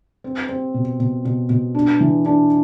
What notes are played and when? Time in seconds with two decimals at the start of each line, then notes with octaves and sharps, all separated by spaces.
0.24 C4
0.49 C4
0.74 B2
1.00 B2
1.25 B2
1.50 B2
1.75 D4
2.01 E3
2.26 D4